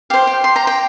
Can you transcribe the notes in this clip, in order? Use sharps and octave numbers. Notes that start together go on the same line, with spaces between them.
G4 C5 F5
G5
C6
A#5
G5